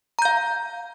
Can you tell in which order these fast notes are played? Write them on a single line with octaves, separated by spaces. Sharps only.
A#5 G6 F5